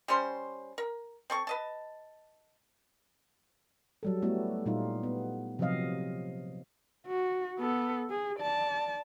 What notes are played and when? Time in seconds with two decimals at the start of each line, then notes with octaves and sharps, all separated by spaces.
0.08 G3 C#4 C5 C6
0.78 A#4
1.30 C4 A4 C#6
1.47 B4 D#5 A5
4.03 F#3 G3 A4
4.22 G3 A3 B3 E4 F#4
4.66 A#2 G3 D#4 F4
5.03 B3
5.59 C3 F3 F#3 C4 D#5 F5
7.07 F#4
7.59 B3 A4
8.10 G#4
8.39 D5 A5